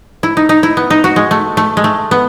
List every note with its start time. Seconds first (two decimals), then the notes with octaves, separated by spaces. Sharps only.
0.23 E4
0.37 D#4
0.49 D#4
0.63 E4
0.77 B3
0.90 D#4
1.04 F#4
1.16 G#3
1.31 A3
1.57 A3
1.77 G#3
1.84 A3
2.11 B3